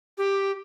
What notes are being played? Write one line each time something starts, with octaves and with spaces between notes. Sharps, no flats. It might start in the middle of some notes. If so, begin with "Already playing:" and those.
G4